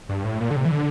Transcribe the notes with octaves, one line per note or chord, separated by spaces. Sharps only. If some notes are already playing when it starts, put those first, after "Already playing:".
G2
A2
A#2
D3
C3
E3
D3